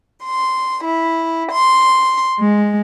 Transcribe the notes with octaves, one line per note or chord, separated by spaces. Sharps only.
C6
E4
C6
G#3